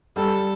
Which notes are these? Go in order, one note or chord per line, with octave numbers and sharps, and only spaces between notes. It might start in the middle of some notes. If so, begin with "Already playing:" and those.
G3 A4